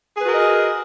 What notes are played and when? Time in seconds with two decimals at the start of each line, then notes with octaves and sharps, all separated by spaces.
0.16 G#4
0.20 B4
0.24 F#4
0.29 A#4
0.33 D#5